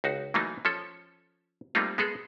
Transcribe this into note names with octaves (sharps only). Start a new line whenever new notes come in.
C#2 D#4 F#4
E3 F#3 A3 A#3 D#4
F3 C#4 A4
G3 A3 A#3 C4 D#4 F4
G#3 B3 G#4 A4